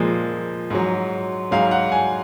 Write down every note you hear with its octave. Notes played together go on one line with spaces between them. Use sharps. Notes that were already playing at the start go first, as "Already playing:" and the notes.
Already playing: A#2 F3 G#3
G#2 F#3
G#2 F#3 F5
F#5
G#5